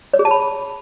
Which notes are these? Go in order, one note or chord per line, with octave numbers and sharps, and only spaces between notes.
C#5
G#4
A5
B5